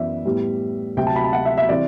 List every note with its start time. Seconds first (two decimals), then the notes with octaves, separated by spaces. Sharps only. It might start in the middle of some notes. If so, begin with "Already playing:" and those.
Already playing: F#2 E3 B3 D5 E5
0.25 A2 G3 B3
0.97 D2 C3 F#3 G5
1.07 A5
1.16 B5
1.24 A5
1.33 F#5
1.45 E5
1.57 E5
1.69 C3 E3 G3 C4 E4 D5